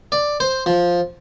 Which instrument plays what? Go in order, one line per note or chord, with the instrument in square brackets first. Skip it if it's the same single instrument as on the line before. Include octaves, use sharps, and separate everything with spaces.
[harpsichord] D5
C5
F3